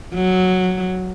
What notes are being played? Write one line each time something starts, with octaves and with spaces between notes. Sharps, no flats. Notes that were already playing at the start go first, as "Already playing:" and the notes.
F#3